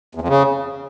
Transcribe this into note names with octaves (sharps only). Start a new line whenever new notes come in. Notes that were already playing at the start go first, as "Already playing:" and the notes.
E2
F2
C#3